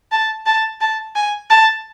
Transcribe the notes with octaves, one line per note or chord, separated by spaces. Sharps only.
A5
A5
A5
G#5
A5